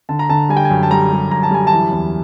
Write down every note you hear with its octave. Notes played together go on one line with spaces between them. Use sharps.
D3 A5
A#5
D3 A5
G3 G#5
G5
G#5
F#2
A5
G3 A#5
G3
F#2 A#5
A5
G3 G#5
A5
E3
E2